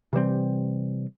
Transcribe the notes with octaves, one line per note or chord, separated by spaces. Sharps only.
C3 E3 G3 C4